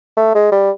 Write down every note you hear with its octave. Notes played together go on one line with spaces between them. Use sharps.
A3
G#3
G3